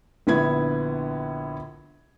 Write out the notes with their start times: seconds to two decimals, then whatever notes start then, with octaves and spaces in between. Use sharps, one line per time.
0.27 A#1 D3 B3 E4 G#6